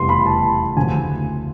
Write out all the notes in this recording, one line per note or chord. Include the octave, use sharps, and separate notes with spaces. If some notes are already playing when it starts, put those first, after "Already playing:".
Already playing: F1 E2 C#3 E3 G3 C6
B5
A5
D2 C#3 F3 G#5